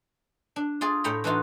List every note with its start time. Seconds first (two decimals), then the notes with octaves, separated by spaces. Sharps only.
0.56 D4
0.81 F4 G#4 D5
1.04 A2 C#5 G5 A#5 B5
1.24 E3 D4 D#4 F4 F#4